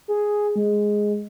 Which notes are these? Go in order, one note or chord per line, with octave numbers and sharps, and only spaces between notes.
G#4
G#3